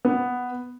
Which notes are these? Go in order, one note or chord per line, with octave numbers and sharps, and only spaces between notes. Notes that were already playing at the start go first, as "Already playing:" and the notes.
B3